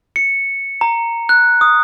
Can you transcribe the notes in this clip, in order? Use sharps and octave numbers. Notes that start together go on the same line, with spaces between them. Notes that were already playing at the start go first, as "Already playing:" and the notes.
C#7
A#5
F#6
D#6